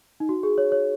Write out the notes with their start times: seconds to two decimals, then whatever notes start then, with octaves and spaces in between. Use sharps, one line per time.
0.20 D#4
0.29 F#4
0.43 G#4
0.58 C#5
0.72 C#5